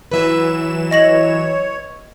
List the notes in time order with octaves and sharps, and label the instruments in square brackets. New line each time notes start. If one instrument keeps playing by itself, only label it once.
[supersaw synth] E3 F#3 E7 [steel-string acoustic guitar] B4 E5
[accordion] C#5 [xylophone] D#5 A#6 F#7